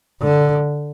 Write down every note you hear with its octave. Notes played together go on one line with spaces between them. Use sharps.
D3